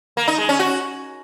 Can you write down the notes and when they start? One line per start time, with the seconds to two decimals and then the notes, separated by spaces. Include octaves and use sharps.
0.17 A#3
0.28 D#4
0.38 G#3
0.49 C#4
0.59 F#4